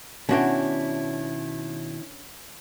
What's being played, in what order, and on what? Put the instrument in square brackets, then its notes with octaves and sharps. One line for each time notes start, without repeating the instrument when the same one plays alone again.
[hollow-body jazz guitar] B2 F#4 G5 [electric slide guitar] D#3 E4 [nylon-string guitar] C#4 D4 C#5